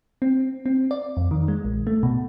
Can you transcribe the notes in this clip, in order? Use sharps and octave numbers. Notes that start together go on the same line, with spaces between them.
C4
C4
D5
F2
D#3
G#3
A#1
A3
B2